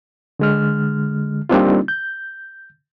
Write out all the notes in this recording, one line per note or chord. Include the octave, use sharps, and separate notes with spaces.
D3 G#3 F6
G3 A#3 C4 D4 D#4 F4
G6